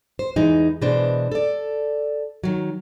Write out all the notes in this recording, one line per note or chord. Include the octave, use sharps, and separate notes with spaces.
C5
E2 E3 G#3 D#4
B2 E3 G#3 D4 C5
A4 D5
D#3 F#3